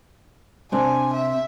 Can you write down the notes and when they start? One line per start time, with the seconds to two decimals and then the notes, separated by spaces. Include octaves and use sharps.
0.72 C3 D4 G#5
1.13 E5